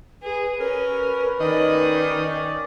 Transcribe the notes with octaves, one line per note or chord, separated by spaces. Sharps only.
G#4 B4
C#4 A#4 B4
D#3 C#4 D5 D#5